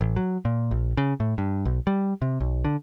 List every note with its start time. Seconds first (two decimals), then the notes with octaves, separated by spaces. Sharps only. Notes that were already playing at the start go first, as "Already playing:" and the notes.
0.01 A1
0.16 F#3
0.45 A#2
0.71 A#1
0.97 C#3
1.20 A2
1.38 G2
1.65 B1
1.87 G3
2.22 C3
2.41 B1
2.65 D3